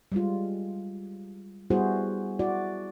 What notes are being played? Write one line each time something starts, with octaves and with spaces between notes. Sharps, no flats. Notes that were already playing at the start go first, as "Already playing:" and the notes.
G3 G#3 F4
G3 B3 E4 F#4 G#4 C5
E4 F#4 D5